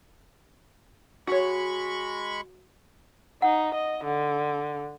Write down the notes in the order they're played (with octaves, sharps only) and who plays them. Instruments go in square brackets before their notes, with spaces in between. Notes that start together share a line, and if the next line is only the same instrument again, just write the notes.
[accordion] G#3 B5 C#6 [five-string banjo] F#4 C#5
[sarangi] D#4 [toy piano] F#5
[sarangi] D#5
D3